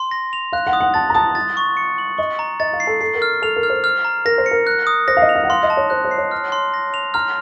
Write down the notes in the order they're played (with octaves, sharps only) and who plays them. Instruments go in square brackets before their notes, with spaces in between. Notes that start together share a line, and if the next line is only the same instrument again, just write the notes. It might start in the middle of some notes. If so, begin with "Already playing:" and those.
Already playing: [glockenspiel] C6
A#6
F7
[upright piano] F5 [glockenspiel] F#6
[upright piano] F#5
[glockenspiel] D#6
[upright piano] F#5
[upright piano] A5 [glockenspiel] A6
[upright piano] A#5
[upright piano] A5 [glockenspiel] D#6
[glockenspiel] A6
C#6
C#7
F#7
[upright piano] D#5 [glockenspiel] C#6
[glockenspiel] A#5
[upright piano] D#5 [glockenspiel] A6
[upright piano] F5
[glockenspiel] C7
[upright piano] A4
[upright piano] A4 [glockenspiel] C7
[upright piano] A#4
[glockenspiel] F6
[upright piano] A4 [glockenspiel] F7
[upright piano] A#4
[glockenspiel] F6
[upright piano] C5
[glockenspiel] F6
A#5
[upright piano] A#4 [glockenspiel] A#6
[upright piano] C5
[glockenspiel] C#7
[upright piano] A#4
[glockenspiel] F#6
D#6
[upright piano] C5 [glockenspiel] A#6
[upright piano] F5
D#5
[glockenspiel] F7
[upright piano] F5
F#5
[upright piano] F5 [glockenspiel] C6
[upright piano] D#5
[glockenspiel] A5
[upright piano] C#5
[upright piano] C5 [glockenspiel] F#6
[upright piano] C5
[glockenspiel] C7
[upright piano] C#5
[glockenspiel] F6
C6
A#6
F7
[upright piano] A#5 [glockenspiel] F6